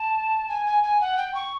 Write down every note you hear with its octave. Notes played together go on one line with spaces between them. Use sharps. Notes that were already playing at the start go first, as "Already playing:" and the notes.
Already playing: A5
G#5
G#5
G#5
F#5
G5
C#6